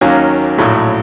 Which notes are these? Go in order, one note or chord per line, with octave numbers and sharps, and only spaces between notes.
D#2 D#3 F#3 A#3 C#4
A#1 A2 F#3 A3